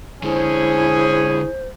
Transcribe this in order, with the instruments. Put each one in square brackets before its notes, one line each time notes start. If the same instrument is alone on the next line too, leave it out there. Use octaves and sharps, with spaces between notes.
[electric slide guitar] D3 G#3 [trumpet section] C#4 G#4 [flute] E4 [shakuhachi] C5